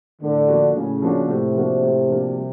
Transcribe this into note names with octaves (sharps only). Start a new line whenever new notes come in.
A2 D3
F3 A#3 D4 F#4
A2 C#3
F3 A#3 D4 F#4
A2 C3
F3 A#3 D4 F#4
A2
F3 A#3 D4 F#4
G3